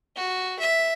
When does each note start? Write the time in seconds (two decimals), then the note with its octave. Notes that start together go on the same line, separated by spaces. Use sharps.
0.16 F#4
0.59 E5